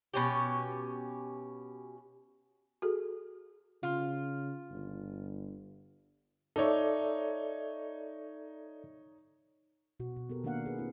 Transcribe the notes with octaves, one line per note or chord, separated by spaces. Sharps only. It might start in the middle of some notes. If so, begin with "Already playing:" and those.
B2 C#4 G4
F#4 G#4 A4
C#3 F4
G1
D#4 A4 C#5 D5 E5
B2 F#4
B2
B3 G4 A4 A#4
D#3 A#3 D4 A#4 F5 F#5
G#4 B4
B3 C4 E4